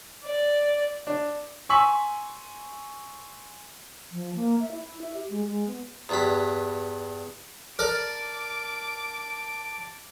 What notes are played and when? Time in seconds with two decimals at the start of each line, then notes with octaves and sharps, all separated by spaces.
0.25 D5
1.07 D4
1.69 G#5 C6 C#6 E6 B6 F#7
4.12 F3
4.35 A#3
4.60 E5
4.72 E4
5.01 E5
5.14 G4
5.30 G#3
5.47 G#3
5.67 B3
6.09 E2 G2 B5
7.79 A#4 D5 A5 D6